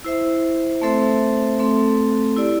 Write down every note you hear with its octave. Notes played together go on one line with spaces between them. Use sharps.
E4 C5 E5
A3 C4 A4 C5 E5
A3 C4 A4
E4 G4 D5